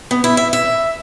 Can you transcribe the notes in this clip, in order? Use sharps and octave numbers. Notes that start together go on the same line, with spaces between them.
B3
E4
E5
E5